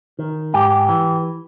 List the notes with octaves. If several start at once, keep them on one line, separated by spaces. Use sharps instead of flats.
D#3
G#2 G4
E3